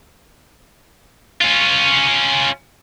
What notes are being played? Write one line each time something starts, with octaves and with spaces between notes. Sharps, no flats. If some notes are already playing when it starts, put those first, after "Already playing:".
C#4 F4